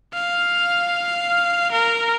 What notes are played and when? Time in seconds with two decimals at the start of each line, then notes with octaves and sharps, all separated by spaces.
0.14 F5
1.72 A#4